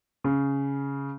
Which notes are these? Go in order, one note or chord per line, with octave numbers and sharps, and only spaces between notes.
C#3